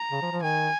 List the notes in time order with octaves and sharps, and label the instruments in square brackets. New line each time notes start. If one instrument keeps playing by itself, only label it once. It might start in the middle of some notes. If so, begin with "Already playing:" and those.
Already playing: [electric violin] A#5
[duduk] C#3
F3
F3
[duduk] D#3 [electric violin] G#5